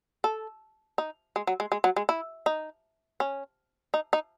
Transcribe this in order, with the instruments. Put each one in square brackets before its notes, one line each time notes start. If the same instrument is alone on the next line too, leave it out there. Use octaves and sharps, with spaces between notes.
[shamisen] A4
D#4
G#3
F#3
G#3
G#3
F#3
G#3
E4
D#4
C#4
D#4
D#4